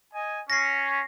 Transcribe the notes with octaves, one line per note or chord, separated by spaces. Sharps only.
D#5 G#5
C#4 A#6 C7